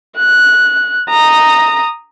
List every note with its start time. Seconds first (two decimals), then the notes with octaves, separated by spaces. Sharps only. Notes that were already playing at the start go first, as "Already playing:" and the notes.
0.18 F#6
1.10 A#5 D#6